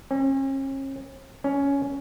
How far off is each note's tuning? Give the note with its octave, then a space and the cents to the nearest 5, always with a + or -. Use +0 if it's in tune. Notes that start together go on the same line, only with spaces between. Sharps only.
C#4 -40
C#4 +10